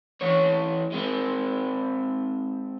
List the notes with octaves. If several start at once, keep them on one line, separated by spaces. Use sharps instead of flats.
E3 C#5
G#3 C4